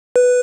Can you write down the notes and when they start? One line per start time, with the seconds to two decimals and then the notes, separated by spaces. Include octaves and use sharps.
0.16 B4